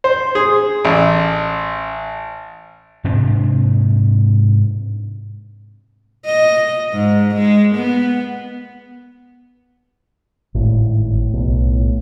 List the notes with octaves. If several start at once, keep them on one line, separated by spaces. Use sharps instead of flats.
C5
G#4
A1
G#2 C3 C4 D4
D#5
G#2
G#3
B3
G#1 A2
B1